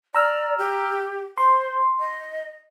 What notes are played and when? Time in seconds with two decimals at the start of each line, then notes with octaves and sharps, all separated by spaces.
0.15 D5 A#5 E6 F6
0.58 G4
1.38 C5 C6
2.00 D#5